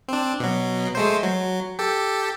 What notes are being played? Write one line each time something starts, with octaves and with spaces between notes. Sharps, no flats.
C4 D4
B2 F#3
G#3 A3 C5
F#3
G4 A4